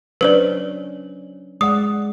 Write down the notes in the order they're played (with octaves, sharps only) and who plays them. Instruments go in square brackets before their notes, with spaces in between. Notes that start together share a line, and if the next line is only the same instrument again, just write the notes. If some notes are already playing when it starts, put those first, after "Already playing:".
[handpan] F#3 C#4 D4 [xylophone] B4 C5 D5
[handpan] G#3 D5 F#5 [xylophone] D#6